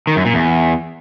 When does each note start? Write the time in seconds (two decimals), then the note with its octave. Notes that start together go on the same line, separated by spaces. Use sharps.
0.07 D#3
0.16 F#2
0.25 A#2
0.34 E2